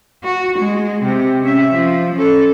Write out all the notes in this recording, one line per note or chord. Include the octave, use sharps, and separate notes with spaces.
F#4
G#3
C3
C#4 E5
F3
C#4 A4